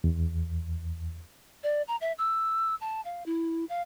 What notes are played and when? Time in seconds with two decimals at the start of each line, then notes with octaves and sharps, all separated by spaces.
0.04 E2
1.63 D5
1.88 A#5
2.01 E5
2.18 E6
2.81 A5
3.05 F5
3.26 E4
3.69 F5